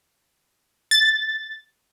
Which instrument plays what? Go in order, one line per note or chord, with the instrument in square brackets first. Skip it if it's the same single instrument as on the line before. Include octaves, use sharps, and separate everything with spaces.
[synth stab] A6